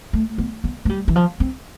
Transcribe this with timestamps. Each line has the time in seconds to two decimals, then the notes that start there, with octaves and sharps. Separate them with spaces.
0.13 A3
0.38 B3
0.64 B3
0.85 A3
0.89 G3
1.08 E3
1.16 F3
1.40 C4